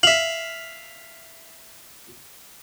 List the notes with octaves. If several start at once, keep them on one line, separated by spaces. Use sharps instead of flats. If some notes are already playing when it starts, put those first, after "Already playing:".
E5 F5 F#7